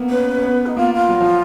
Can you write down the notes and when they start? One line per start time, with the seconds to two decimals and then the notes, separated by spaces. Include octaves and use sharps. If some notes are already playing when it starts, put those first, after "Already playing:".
Already playing: A#3 B3
0.09 C#4 B4
0.37 C#4
0.43 B3
0.66 D#4
0.76 A#3 F4
0.93 F4
1.09 F#3
1.20 F3